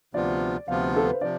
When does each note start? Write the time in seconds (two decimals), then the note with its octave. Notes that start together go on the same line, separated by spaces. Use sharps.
0.14 D2 C3 F3 B3 F4 D5
0.68 D2 C3 F3 B3 F4 F5
0.96 A4
1.04 B4
1.13 C5
1.21 C3 F3 D5